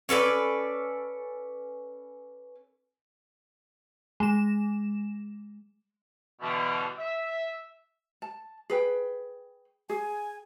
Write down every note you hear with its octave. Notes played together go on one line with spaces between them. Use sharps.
C#4 A4 B4 D5
G#3 E7
B2 D3 E3 G3
E5
A5
G#4 B4 G5
G#4 G#5